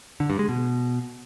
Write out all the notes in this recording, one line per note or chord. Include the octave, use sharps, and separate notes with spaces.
D3
G2
G#3
B2